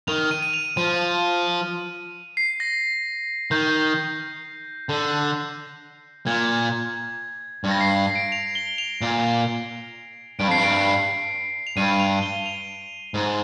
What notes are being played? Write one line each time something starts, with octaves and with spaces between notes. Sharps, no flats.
D#3 F7
D#7
D#7
F7
F3 D#7
C7
A#6
D#3 G6
D3
A#2 G#6
G2
A#6
C7
C7
D7
F7
G7
F7
A#2
G2 D7
F2 C7
G2
D7
F7
G2 D#7
F7
G7
F7
G#2